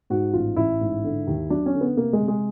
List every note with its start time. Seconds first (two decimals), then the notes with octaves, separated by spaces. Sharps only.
0.10 G#2 F#4
0.33 A1 F4
0.56 A1 E4
0.81 G#2
1.04 D3
1.27 D#2
1.50 F#3 D4
1.66 C#4
1.74 D3
1.81 B3
1.97 C3 A#3
2.13 G#3
2.21 C3
2.28 G#3